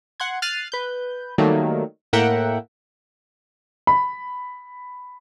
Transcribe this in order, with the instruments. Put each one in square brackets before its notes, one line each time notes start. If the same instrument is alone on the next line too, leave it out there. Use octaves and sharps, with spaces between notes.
[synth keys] F#5 C6 G#6
F6 F#6 A6 C7 D#7
B4 G6
D#3 F#3 G3 A3 A#3
A2 A#3 A#4 E5 F#5 G5
[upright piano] B5